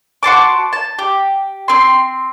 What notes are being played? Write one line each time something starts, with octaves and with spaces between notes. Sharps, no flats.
F#4 C5 A5 D6
A5
G4
C4 C6